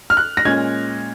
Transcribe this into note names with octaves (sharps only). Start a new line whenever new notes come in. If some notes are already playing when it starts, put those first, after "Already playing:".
F6
F#6
A#6
A#2 G#3 C#4 G#6